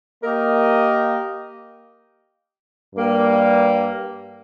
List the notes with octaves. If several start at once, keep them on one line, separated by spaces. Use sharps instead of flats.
A#3 G4 A#4 D#5
G2 G3 A#3